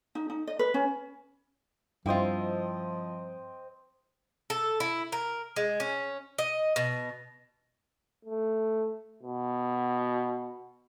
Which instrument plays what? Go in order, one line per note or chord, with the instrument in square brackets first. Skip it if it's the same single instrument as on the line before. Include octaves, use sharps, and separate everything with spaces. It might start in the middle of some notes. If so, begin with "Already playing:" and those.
[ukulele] D#4
D#4
D#5
B4
C#4
[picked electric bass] G2 [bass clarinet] F3 [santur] C4 D#5 G5 [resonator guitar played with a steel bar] E4 F4
[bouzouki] A4
E4
A#4
G#3
C#4
D#5
B2
[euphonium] A3
B2